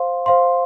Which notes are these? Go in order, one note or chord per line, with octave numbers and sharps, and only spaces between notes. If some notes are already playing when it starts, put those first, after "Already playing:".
Already playing: C5 F5 C6
C5 F5 C6